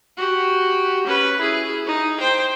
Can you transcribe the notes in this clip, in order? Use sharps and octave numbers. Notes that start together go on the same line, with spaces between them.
F#4 G4
C#4 B4
E4 G#4
D#4
C5 G5